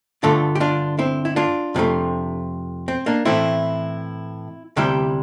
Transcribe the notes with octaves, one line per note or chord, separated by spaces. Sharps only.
G2 D3 A3 F4 A4
G4
D4 F4
C4 E4
E4
D4 F4
F2 C3 F3 A3
C4
A#3 D4
A2 E3 A3 C4 E4
D2 C3 G3 E4 G4